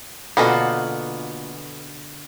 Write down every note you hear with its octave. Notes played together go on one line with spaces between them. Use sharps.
B2 D3 A#3 B3 C#4 F4 F#4 A4